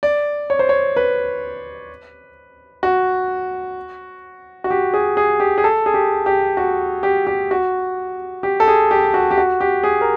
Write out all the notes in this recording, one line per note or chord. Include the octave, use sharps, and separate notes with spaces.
D5
C#5
C5
C#5
B4
F#4
F#4
G4
G#4
G#4
G4
G#4
A4
G#4
G4
G4
F#4
G4
G4
F#4
G4
A4
G#4
G4
F#4
G4
F#4
G4
G#4
A#4